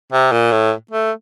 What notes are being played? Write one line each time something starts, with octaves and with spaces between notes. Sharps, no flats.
C3
A#2
A2
A3